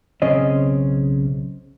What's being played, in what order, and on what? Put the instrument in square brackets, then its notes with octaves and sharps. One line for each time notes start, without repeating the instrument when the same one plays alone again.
[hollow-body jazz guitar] B1 C#3 C4 C#4 D#5